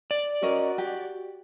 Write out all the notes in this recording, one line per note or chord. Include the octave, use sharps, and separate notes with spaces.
D5
C#4 F#4 A#4 D#5
G4